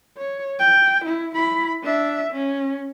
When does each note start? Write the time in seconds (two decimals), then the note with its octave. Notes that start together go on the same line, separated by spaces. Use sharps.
0.17 C#5
0.60 G5
1.05 E4
1.35 E4 B5
1.83 D4 E5
2.32 C#4